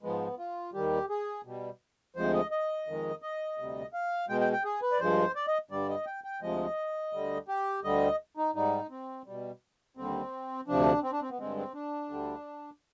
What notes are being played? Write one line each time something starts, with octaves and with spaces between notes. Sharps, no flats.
G#2 F3 G#3 B3
F4
D#2 D#3 G3 G4
G#4
B2 G3
D2 C3 F3 G#3 C5
D#5
D#5
F2 D#3 G#3
D#5
D2 C3 G3
F5
B2 G#3 G5
G5
G5
G#4
B4
D5
G2 F3 G#3 C5
D5
D#5
G2 D3 G3 D5
D#5
G5
G5
D2 C3 F3 G#3 D#5
D2 D3 G3
G4
D2 D3 G3 D#5
D#4
G#2 G3 D#4
C4
B2 G3
D#2 D3 G3 C4
D2 C3 F3 D4
C4
D4
C4
B3
G2 D3 G#3 C4
C4
D4
D2 D3 G3